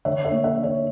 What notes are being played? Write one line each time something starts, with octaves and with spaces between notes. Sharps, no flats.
D3 C#5 E5
C#5 E5
A#3
C#5 E5
D3
C#5 E5